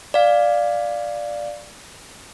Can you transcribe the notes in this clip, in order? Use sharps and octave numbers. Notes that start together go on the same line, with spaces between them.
D5 F5